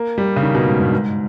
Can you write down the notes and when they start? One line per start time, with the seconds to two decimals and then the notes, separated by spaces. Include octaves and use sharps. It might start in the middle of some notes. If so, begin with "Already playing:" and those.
Already playing: A#3
0.18 G3
0.36 C#3
0.43 D#3
0.55 B2
0.67 G#2
0.80 G2
0.93 G#2